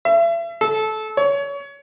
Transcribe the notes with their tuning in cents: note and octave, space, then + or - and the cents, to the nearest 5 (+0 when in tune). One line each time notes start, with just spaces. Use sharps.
E5 +35
A4 -20
C#5 +25